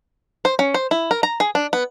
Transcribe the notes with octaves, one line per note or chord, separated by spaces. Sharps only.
C5
C#4
C5
E4
A#4
A#5
G#4
D4
B3